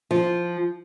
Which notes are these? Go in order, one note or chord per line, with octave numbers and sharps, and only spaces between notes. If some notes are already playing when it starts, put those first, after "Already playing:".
F3